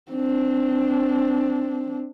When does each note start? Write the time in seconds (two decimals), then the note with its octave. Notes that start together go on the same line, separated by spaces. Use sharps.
0.12 C4 D4